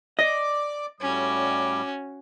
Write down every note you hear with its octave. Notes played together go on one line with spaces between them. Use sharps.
D5 D#5 D6
A2 G3 C#4 F#4 D6